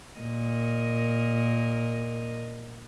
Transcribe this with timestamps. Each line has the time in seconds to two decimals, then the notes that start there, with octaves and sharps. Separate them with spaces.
0.19 A#2 A#4 D#5